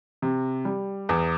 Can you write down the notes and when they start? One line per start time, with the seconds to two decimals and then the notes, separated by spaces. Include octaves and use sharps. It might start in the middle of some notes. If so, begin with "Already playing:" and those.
0.22 C3
0.65 G3
1.09 E2